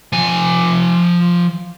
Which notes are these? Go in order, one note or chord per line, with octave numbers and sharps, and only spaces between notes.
F3 G#5